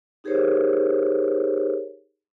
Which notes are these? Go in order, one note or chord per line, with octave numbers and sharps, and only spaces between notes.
D#4 G4 G#4 A#4 C5 C#5